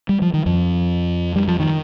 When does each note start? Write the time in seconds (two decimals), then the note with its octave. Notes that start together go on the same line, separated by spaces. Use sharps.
0.09 G3
0.22 F3
0.34 D#3
0.46 F2 F3
1.36 G3
1.48 F3
1.60 D#3